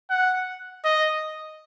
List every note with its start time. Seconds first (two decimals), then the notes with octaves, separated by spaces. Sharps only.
0.10 F#5
0.84 D#5